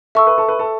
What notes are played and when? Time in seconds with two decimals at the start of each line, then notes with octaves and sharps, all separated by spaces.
0.15 A4 E5 C#6 E6
0.27 B4
0.38 A4
0.48 B4
0.59 A4